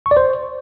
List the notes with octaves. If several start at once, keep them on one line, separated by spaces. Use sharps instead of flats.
C#6
D5
C5